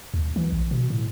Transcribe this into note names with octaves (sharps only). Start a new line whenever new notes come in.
D#2
E3
A#1
B2
A2